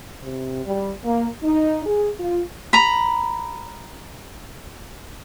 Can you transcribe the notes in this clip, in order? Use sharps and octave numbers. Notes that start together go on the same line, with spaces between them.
C3
G3
A#3
D#4
G#4
F4
A#5 B5